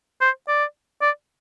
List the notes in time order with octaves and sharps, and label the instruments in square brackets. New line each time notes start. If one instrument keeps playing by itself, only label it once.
[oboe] C5
D5
D5